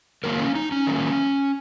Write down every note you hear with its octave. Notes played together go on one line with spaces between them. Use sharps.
D#3 F#3 A#3 A#4
C#4
D#4
C#4
D#3 F#3 A#3